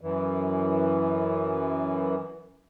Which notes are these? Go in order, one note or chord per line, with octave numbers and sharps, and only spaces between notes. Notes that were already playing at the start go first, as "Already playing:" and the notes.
F#2 E3